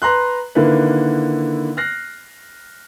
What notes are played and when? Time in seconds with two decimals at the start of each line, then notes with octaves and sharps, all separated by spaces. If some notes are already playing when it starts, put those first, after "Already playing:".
0.02 B4 A#5 C6 F#6
0.55 D3 D#3 A#3 E4 B4
1.77 F6 F#6 A#6 C7